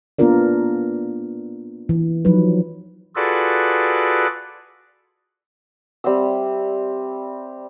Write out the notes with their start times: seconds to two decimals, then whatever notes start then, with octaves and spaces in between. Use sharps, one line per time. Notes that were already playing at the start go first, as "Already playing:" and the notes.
0.19 A#3 B3 D4 F4 A#4 D5
1.89 E3
2.25 F3 F#3 D#4 B4
3.16 F4 F#4 G#4 A4 B4 D5
6.04 G3 C4 E5 E6